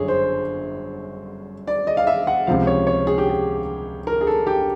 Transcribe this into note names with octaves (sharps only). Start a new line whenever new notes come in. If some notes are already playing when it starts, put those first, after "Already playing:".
Already playing: G1 F#2 D3 G#4 C#5
C5
D5
D#5
F5
E5
F#5
C#2 C3 F3 F5
C#5
C#5
G#4
G4
G#4
A#4
G#4
A4
G4